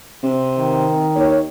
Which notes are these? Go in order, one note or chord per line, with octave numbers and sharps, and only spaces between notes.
C3
D#3
D#2 C#5